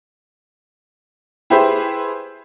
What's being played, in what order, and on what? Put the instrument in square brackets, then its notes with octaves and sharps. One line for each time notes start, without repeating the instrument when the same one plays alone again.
[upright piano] E4 G4 G#4 B4 C5 E5